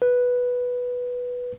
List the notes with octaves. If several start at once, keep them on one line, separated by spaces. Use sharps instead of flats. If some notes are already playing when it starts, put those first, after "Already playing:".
B4